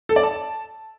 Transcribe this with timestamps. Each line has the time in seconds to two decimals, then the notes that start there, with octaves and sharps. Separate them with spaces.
0.09 A4
0.16 D5
0.23 A5